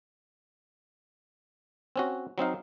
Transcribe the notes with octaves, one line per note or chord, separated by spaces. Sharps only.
C4 C#4 F#4
F#3 C4 D#4 F5